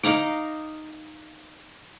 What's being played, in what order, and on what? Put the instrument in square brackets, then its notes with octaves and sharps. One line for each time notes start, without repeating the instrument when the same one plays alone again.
[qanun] D#4 F5 A#5 D6